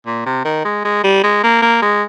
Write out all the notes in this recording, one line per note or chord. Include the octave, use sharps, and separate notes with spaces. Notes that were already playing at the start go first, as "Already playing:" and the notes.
A#2
C3
D#3
G#3
G#3
G3
G#3
A#3
A#3
G#3